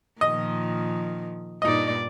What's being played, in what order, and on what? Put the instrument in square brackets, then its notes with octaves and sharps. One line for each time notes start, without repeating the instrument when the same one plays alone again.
[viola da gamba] A#2 D#3 F3 [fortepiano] D#5
[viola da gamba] G2 A#2 D5 [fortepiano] D#4 D#5